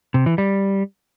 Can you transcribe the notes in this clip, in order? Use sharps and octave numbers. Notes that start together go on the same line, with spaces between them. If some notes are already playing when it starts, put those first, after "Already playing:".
C3
E3
G3